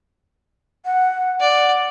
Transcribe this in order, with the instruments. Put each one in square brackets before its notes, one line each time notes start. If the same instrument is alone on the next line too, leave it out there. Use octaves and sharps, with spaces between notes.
[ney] F#5
[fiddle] D5 [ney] F#5